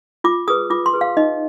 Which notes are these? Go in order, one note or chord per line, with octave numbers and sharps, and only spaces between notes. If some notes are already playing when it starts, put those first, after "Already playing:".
F4 D6
G#4 B4 D#6
F4 D6
C6
G#4 B4
F5
D#4 D#5